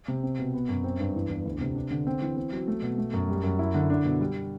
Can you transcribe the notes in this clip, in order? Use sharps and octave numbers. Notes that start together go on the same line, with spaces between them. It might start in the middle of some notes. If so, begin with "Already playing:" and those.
C3
C4
B2
B3
F#2
C4
G2
E3
E2
D2
C3
D4
D3
C4
E3
C4
F#3
A3
B2
A3
F#2
G3
F#2
E4
D3
D4
B2
G3